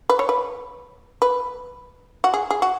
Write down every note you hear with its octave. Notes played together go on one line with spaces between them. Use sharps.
B4
C#5
B4
B4
F#4
G#4
G#4
F#4